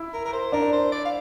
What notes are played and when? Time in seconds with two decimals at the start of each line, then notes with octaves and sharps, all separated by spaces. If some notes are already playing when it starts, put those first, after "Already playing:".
Already playing: E4
0.13 A#4
0.25 A#4
0.33 C5
0.52 D4 A#4
0.72 C5
0.92 D5
1.05 F5